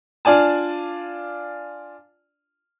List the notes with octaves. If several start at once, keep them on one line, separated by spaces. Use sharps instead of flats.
D4 F4 D5 G#5 A5